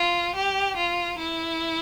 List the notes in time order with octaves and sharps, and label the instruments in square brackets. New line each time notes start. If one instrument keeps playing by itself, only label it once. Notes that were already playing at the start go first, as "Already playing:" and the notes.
Already playing: [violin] F4
G4
F4
E4